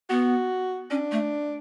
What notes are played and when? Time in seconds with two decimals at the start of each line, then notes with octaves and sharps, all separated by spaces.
0.10 B3 F#4
0.91 C#4 D4
1.12 A3